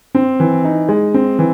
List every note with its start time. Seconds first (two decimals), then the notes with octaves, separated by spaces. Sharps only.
0.15 C4
0.40 E3
0.64 D#4
0.89 G#3
1.14 C4
1.39 E3